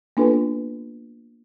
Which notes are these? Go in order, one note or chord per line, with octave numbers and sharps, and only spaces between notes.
A#3 B3 D4 F4 A4 B4